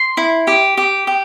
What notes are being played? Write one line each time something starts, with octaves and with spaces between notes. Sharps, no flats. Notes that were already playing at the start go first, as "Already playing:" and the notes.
Already playing: C6
E4
G4
G4
G4